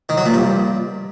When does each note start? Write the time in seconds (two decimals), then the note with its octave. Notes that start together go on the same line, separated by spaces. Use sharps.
0.09 D#3
0.17 F#3
0.26 A#2
0.34 G2